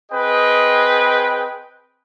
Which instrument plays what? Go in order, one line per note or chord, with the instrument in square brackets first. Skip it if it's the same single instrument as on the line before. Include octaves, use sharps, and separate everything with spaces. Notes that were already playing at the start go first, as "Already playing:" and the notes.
[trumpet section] C4 G#4 B4 D#5 G5